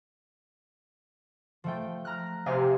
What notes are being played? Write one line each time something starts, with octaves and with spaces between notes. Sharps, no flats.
F3 A3 G5
A#5 F6 F#6
C3 F5 G#5